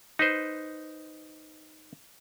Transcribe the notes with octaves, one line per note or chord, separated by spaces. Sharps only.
D#4 B4 C5